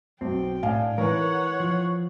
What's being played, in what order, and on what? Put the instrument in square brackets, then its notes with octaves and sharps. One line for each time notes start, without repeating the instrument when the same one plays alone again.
[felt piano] B1 [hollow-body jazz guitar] C4 [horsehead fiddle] G5
[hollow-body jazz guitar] A2 D4 [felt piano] F5 G#5
[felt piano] E3 B4 [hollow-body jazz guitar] A#4 [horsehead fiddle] C#5 F#5
[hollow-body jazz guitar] F3